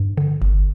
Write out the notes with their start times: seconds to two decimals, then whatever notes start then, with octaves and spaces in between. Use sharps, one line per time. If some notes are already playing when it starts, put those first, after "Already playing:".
Already playing: G2
0.17 D3
0.42 G1